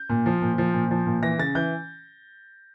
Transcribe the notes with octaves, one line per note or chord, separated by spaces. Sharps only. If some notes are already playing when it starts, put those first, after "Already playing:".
Already playing: G6
A#2
F3
A#2
F3
A#2
F3
A#2
E3 A#6
C#3 A6
E3 G6